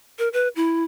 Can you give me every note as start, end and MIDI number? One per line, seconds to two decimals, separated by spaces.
0.19 0.29 70
0.33 0.48 71
0.56 0.84 64